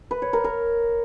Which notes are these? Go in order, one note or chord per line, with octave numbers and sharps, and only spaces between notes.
B4
C#5
A#4
A#4